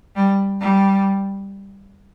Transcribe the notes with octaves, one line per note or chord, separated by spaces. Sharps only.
G3
G3